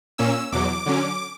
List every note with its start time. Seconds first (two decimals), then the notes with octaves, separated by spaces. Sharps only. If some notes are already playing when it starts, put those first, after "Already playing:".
0.18 A#2 A#3 C#4 E6
0.52 E2 B2 F#3 D6
0.86 D3 F#3 C#4